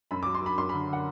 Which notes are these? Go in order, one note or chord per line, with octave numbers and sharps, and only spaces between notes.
F#2 B5
F#3 D6
C6
F#3 B5
F#2 C6
D3 B5
D3 F#5